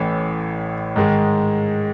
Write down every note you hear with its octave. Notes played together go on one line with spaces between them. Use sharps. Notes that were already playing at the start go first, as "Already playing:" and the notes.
Already playing: A1 A2 E3
G#2 D#3 G#3